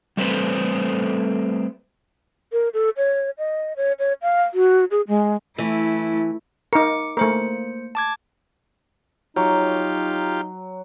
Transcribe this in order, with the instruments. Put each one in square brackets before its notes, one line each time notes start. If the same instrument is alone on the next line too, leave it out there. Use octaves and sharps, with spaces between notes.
[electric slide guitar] G3 A3 C4 A4 B4 C5
[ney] A#4
A4
C#5
D#5
C#5
C#5
F5
F#4
G#4
G#3
[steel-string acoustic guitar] E3 [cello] A3 E4
[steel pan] D#4 A#4 [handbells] D6 C#7
[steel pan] A3 A#4 [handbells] A#3 C5 C#7
[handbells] A5 D6 G#6
[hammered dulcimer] F#3 [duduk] D#4 [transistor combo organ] F4 G4